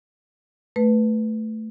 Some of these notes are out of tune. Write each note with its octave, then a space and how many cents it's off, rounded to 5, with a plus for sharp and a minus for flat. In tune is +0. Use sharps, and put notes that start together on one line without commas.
A3 +0 B4 +0